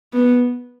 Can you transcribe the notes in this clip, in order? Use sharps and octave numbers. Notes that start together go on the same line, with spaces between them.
B3